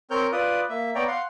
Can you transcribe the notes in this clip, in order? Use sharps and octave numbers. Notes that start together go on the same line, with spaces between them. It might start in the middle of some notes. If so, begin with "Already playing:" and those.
C4 A#4 C#5 F6 G6
F4 B4 D5 D#6
A#3 E5
B3 C#5 D5 G5 A#5
F5 F#5 C6